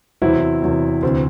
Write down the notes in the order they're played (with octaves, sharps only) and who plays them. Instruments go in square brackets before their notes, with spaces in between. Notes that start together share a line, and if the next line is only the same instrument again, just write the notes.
[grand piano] E2 C3 F#3 C4 E4
E2 C3 F#3
D2 C3 E3 C4